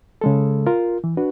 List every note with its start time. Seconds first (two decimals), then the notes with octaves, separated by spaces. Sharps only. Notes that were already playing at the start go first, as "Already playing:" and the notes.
0.21 C#3 G#3 A4
0.66 F4 A#4
1.04 E3
1.17 D4 F#4 B4